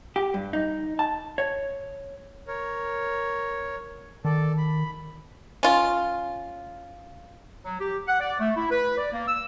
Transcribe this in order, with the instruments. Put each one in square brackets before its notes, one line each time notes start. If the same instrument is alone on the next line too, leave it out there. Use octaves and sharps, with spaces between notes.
[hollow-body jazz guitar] G4
G2
D#4
A5
C#5
[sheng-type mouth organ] A#4 C#5
[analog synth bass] D#3 [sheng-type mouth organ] A4 D5
[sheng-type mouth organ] B5
[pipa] C#4 F4
[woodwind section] F#3
G4
F#5
D5
A3
E4
B4
D5
A#3
E6